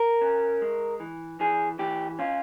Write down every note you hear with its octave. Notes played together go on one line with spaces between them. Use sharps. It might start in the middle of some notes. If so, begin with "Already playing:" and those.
Already playing: A#4
C#4
G#3
E3
E3 G#4
E3 G4
C#4 F4